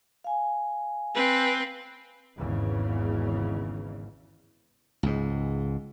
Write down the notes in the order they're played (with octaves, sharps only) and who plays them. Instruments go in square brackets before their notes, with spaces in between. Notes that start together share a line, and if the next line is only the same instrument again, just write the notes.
[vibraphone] F5 G#5
[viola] C4 B4
[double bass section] G#1 E2 G#2 C#3
[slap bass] C#2 G#2